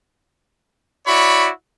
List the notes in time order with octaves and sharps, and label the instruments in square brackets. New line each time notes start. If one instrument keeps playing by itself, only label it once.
[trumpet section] E4 F#4 C#5 D5 B5